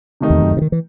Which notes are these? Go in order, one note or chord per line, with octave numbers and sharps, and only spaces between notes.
C3 D#3 A3 D#4
E2
F#2
G2
C3
D#3
E3